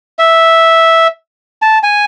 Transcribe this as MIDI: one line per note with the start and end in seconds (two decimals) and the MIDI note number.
0.19 1.07 76
1.62 1.78 81
1.83 2.05 80